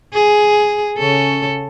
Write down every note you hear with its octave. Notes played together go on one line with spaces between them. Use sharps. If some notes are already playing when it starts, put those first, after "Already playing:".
G#4
C#3 C#4 A4